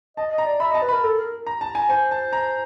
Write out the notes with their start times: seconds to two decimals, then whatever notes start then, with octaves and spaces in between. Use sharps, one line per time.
0.17 D#5 A5
0.32 D#5
0.38 A#5
0.46 D5
0.60 E5 B5
0.71 D#5 A5
0.82 B4
0.89 A#4 B5
1.03 A4
1.18 A#4
1.47 A#5
1.61 A5
1.75 G#5
1.89 C5 G#5
2.11 A5
2.33 A#5